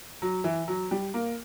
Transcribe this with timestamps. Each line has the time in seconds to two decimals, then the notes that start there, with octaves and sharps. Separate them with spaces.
0.22 F#3
0.44 E3
0.68 F#3
0.91 G3
1.14 A#3